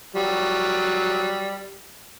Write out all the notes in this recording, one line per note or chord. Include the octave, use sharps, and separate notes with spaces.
F#3 G3